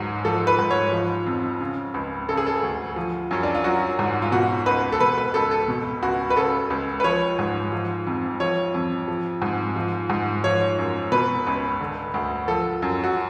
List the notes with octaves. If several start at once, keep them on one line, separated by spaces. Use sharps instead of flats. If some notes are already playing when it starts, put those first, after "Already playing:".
Already playing: C#2 G#2 F#3
F3 A4
B4
G#2
C#5
F3
F2
C#3
C#2
C#3 A4
G#4
A4
D2
F3
F#2 C#4
D4
F4
F#3 F#4
G#2
F4
B2 F#4
C#2 B4
A4
B2 B4
B4
C#2 A4
A4
B2
C#2 F#4
B4
C#3 A4
C#2
B4
F3 C#5
G#2
F3
F2
F3 C#5
F2
F3
G#2
F3
G#2
F3 C#5
F#2
B2 B4
C#2
D3
D2
F3 A4
F#2
F#4